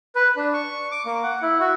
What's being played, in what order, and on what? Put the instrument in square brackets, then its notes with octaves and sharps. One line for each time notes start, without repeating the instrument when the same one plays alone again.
[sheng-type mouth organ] B4
D4
C#6
D6
A#3
F#5
E4
F#4